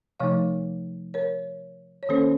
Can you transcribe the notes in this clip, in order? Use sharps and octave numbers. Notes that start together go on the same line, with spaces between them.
C3 F3 A3 D#4 C#5 F5
A#4 C#5
C#5
D#3 A#3 C#4 A4 C5